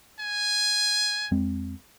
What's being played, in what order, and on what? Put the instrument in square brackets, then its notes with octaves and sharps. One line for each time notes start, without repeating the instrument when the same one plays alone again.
[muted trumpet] G#5
[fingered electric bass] F2 G#3 C4